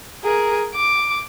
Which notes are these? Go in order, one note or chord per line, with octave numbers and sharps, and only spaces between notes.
G#4 A#4
D6